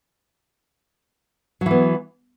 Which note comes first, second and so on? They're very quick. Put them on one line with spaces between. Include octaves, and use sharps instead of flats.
F#3 E3 B3